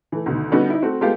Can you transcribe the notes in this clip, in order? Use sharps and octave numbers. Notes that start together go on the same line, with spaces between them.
E3 A3
D2 B2 D#3
D3 G3 B3 C#4 D#4 F#4
D#4 E4
A3 C4 F#4
G#3 A3 B3 F4 G4